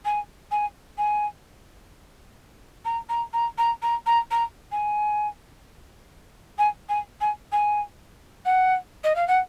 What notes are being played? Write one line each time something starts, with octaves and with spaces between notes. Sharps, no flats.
G#5
G#5
G#5
A#5
A#5
A#5
A#5
A#5
A#5
A#5
G#5
G#5
G#5
G#5
G#5
F#5
D#5
F5
F#5